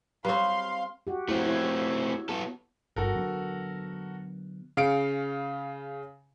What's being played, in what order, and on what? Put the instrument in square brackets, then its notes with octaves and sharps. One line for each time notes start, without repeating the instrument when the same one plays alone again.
[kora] G3 C4 [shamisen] B4 C#5 [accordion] F5 [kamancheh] C6
[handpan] F#4 G4
[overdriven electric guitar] A3 C4 [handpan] E4 C#5
[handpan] E4 C#5
[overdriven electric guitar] B3 A4
[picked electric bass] G1 G2 [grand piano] F#4 A4 A#4
[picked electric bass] D3 F#3 B3
[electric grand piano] C#3 F5 C#7 D7